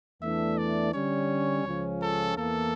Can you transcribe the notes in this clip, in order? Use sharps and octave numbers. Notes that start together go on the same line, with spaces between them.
E2 E3 A3 D4 E5
D5
D3 G3 C#4 C#5
C#2 C#3 F3 C#4
A4
E2 E3 A#3 A4